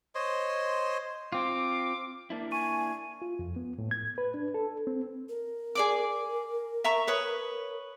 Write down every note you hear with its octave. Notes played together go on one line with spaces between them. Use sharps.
C5 C#5 D#5 C6
C4 F4 D6
A#3 D4 E4
G#5 C#6 D#7
F4
F2
B3
A2
G#6
B4
D4
A4
C4
A#4
G#4 D5 D6
E5 A#5 C#6
B4 C#5 D#6